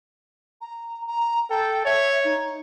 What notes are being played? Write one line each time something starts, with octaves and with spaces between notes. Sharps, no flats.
A#5
A#5
A4 G5
C#5 E5
D#4